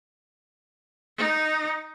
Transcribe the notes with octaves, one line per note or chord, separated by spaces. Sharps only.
D#4